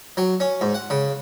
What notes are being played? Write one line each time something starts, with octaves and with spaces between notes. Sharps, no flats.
F#3
C#4
G#2
F#5
C#3